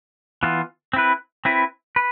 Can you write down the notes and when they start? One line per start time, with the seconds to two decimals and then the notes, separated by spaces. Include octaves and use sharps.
0.43 E3 B3 F4
0.93 C4 E4 B4
1.45 C4 E4 B4
1.96 B4